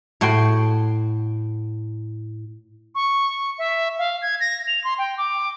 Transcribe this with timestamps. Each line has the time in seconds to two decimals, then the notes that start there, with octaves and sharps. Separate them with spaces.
0.21 A2 F#4 F#5 G5 C6
2.95 C#6
3.58 E5
3.99 F5
4.22 G#6
4.40 A#6
4.68 F7
4.84 C6
4.98 G5
5.18 D6